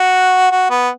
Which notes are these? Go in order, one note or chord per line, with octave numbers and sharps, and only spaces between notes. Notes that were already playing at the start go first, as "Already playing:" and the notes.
Already playing: F#4
F#4
B3